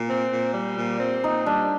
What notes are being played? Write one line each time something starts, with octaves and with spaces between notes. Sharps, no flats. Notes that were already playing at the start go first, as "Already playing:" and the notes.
Already playing: A#2
C4
A#2
G3
A#2
C4
A#2 D#4
G3 D4